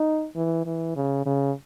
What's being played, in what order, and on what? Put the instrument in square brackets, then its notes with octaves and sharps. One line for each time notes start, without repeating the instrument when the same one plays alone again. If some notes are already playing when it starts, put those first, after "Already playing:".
Already playing: [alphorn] D#4
E3
E3
C#3
C#3